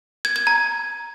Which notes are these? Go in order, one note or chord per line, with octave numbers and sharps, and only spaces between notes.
G#6
G#6
A#5